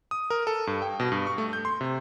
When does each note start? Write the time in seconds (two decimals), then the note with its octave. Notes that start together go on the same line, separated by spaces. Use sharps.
0.11 D#6
0.30 A#4
0.47 A4
0.67 G2
0.82 G5
1.00 B2
1.12 G2
1.27 C#6
1.38 A3
1.53 G6
1.65 C6
1.81 C3